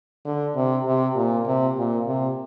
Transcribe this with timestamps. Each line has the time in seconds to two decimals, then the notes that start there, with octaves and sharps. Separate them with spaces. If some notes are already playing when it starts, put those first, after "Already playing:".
0.25 D3
0.56 C3
0.86 C3
1.16 A#2
1.46 C3
1.77 A#2
2.07 C3